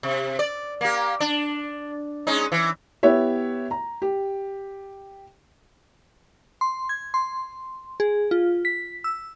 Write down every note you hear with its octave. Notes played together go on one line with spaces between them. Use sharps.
C3
D5
A#3 G4
D4
G#3 C#4 D#4
E3
B3 E4 G4 C#5 E5
A#5
G4
C6
G#6
C6
G#4
F4
B6
E6